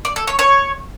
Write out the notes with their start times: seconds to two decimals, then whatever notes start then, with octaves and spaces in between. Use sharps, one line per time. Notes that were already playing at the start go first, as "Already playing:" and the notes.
0.05 D5
0.16 A4
0.27 C#5
0.39 C#5